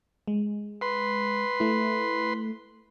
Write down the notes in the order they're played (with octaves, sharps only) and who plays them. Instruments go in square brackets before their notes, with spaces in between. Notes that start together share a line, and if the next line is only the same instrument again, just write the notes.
[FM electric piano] G#3
[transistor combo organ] B4 C6
[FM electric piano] A3 E4